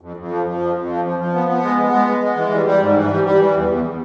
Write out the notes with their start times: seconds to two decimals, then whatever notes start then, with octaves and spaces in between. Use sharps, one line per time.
0.01 F2
0.17 F2
0.31 F3
0.46 F3
0.60 F2
0.75 F2
0.89 F3
1.05 F3
1.19 F3
1.34 B3
1.48 B3
1.63 G#3
1.79 B3
1.92 G#3
2.07 G#3
2.22 G#3
2.37 E3
2.52 G3
2.66 G3
2.81 G#2
2.96 E3
3.10 G3
3.24 G3
3.40 E3
3.55 E2
3.69 E2